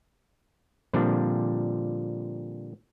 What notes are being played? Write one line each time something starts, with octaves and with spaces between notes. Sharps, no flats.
A#2 D3 F3 G3 C4 D4